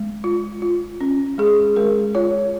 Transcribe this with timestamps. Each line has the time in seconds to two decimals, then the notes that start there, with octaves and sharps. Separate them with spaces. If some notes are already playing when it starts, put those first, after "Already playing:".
Already playing: G#3
0.24 F4
0.62 F4
1.01 C#4
1.38 G#3 G#4
1.76 G#3 A#4
2.15 F4 C#5